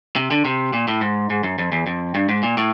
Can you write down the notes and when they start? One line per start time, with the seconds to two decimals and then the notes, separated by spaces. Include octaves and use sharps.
0.16 C3
0.31 D3
0.45 C3
0.73 A#2
0.88 A2
1.01 G#2
1.30 G#2
1.43 F#2
1.58 F2
1.72 E2
1.87 F2
2.15 G2
2.29 G#2
2.43 A#2
2.57 A2